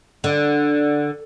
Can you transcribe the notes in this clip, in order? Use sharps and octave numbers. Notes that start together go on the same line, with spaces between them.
D3